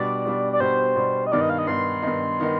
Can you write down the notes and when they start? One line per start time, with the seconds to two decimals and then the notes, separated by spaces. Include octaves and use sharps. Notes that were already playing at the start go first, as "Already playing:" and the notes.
Already playing: B2 G3 D4 D5
0.25 B2 G3 D4
0.53 D5
0.60 B2 G3 D4 C5
0.96 B2 G3 D4
1.27 D#5
1.32 G2 D#3 B3 D#4 D5
1.41 D#5
1.50 F5
1.59 D#5
1.67 G2 D#3 B3 D#4 C6
2.02 G2 D#3 B3 D#4
2.40 D#3 B3 D#4